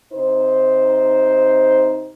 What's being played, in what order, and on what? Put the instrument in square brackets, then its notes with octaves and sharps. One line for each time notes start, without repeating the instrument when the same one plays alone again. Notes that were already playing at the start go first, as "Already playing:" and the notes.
[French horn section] C3 D#4 C5